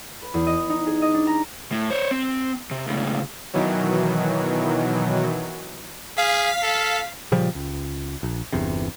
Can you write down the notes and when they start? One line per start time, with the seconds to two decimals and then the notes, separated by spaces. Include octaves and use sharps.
0.22 B4
0.34 E2
0.47 D#5
0.69 D#4
0.87 G#4
1.02 D#5
1.14 D4
1.27 A#5
1.72 A2
1.90 C5 C#5
2.11 C4
2.71 C3
2.88 C#2 A2
3.54 B2 D#3 E3 F#3
6.17 G#4 F5 B6
6.63 A4
7.32 A#2 C#3 F3 G3
7.55 C#2
8.23 A#1
8.53 G1 E2 C3